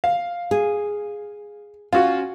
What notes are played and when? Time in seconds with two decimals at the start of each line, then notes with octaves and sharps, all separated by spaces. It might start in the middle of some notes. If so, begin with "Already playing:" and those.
0.04 F5
0.51 G#4
1.93 C#4 F4 F#4